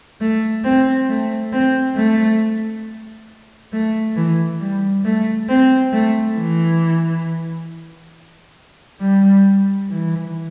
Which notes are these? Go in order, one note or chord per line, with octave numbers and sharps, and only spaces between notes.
A3
C4
A3
C4
A3
A3
E3
G3
A3
C4
A3
E3
G3
E3